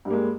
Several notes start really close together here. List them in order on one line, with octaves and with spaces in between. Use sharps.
G2 G3 A#3 G#3